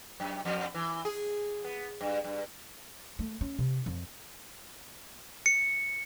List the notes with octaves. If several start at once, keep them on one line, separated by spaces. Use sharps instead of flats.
F#2
F2
E3
G#4
B3
G2
G2
A3
C#4
C3
F2
C#7